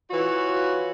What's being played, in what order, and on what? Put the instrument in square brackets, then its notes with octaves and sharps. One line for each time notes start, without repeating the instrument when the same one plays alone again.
[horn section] E3 F4 F#4 B4 C#5